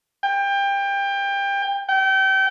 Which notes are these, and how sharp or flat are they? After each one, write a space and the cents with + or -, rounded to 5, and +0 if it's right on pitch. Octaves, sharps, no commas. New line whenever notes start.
G5 +25
G5 -30